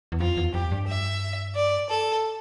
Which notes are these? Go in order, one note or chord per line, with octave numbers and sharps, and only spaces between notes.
E2
F2 F4
E2
F2 G4
G2
E5
D5
A4